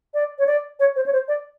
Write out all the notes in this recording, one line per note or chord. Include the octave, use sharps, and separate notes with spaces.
D5
C#5
D5
C#5
C5
C#5
C5
D5